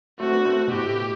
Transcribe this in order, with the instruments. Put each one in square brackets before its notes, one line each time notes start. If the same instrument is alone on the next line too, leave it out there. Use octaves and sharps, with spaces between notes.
[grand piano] A3 C4 [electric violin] F#4
[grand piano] B3 D4
A3 C4
B2
[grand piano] A2 [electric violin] G4